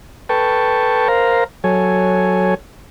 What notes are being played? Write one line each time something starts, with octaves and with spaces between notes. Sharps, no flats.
A4 B4 G5 A5 C#6
A#4 C5 F5 A#5
F#3 A4 C#5 G#5